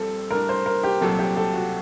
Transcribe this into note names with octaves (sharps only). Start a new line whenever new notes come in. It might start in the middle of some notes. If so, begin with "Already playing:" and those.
Already playing: A#1 A#2 G3 C4 A4
A2 G3 D4 A#4
C5
A#4
G4
C2 A#2 F#3 C4 A4
G4
A4
F#4